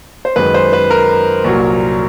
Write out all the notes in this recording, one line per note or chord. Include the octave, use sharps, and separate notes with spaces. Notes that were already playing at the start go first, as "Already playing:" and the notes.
C5
F#2 D#3 G#3 B4
C5
B4
A#4
C2 A#2 F#3